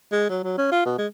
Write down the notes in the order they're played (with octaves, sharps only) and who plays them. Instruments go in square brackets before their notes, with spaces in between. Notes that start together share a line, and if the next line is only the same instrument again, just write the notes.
[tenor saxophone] G#3
F#3
F#3
C#4
F4
B2
G#3